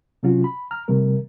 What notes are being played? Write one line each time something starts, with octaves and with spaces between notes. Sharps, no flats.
C3 F#3 C#4 F4 F#4
B5
A#5 F6
C3 D#3 G3 A3 A#4